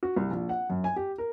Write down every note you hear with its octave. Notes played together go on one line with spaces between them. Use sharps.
F#4
C2
A#1
F#5
F#2
G#5
G4
A#4